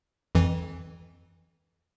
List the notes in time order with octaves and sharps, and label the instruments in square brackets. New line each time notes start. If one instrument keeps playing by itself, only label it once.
[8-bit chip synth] F2 E3